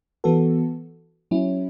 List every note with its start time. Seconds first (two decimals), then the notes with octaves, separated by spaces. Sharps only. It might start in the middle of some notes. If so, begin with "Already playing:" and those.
0.24 E3 B3 F#4 A4
1.31 F#3 C#4 E4